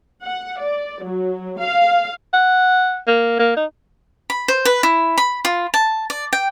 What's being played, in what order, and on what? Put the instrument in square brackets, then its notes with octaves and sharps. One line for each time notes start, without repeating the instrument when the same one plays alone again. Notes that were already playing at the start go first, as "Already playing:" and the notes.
[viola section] F#5
D5
F#3
F5
[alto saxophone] F#5
A#3
A#3
D#4
[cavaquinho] B5
C5
B4
E4
B5
F4
A5
D5
G5